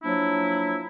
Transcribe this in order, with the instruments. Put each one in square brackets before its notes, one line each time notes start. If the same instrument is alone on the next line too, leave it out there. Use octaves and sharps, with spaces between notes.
[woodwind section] F3 F#3 A#3 D4 E4